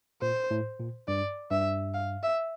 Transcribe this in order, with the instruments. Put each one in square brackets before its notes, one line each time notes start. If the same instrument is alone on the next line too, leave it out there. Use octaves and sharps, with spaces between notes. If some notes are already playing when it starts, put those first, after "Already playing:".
[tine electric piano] A#2 [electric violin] C5
[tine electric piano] A2
A#2
[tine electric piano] G2 [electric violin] D5
[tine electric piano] G2 [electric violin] E5
[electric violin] F5
E5